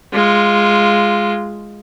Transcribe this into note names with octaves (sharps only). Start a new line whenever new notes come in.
G#3 F4